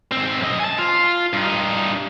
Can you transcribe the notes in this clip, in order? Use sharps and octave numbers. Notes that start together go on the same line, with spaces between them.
G#2 C4
F#2 D#5
G#5 A5
F4
G2 D#4